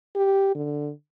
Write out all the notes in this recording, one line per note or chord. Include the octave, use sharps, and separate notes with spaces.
G4
D3